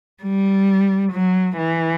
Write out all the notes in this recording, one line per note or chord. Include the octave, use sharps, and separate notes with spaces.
G3
F#3
E3